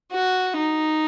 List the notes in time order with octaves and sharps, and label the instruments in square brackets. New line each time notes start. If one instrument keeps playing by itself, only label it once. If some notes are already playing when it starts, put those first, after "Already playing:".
[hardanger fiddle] F#4
D#4